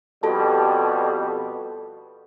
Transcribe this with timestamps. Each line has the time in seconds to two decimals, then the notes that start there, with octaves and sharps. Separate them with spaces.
0.23 F2 B2 G3 F#4 A4 A5